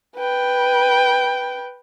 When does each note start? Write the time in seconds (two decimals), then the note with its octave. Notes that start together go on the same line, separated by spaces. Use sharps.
0.16 B4 G5